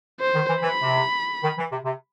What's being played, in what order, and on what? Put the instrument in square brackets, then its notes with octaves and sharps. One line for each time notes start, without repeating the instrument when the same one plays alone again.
[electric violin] C5
[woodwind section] D#3
E3
[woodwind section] E3 [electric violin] B5
[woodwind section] C3
D#3
E3
C3
C3